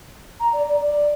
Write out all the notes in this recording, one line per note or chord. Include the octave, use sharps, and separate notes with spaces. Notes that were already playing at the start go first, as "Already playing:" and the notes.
A#5
D5
D5
D5